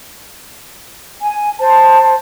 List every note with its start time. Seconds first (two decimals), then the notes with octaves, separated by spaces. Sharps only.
1.21 G#5
1.58 C5 A5